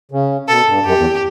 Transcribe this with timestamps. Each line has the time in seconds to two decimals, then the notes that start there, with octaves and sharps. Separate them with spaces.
0.11 C#3
0.48 B2 A4
0.66 G2
0.85 F#2 G4
0.97 E2